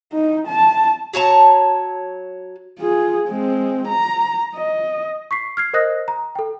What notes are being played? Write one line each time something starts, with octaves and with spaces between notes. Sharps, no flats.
D#4
A5
F#3 C#5 A5 A#5
F4 G#4
G#3 C4
A#5
D#5
C#6 B6 C7
F6 G#6 C7
A#4 C5 D#5 D#6 F#6 A#6
A#5
A4 G5